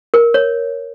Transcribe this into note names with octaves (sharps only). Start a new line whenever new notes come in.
A#4
C#5